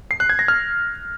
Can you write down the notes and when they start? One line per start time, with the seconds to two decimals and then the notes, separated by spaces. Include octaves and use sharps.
0.11 C7
0.20 F#6
0.29 G#6
0.39 A#6
0.48 F6